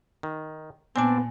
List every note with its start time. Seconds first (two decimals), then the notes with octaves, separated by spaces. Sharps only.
0.23 D#3
0.96 A#2 B3 C4 D4 D5 G#5 A5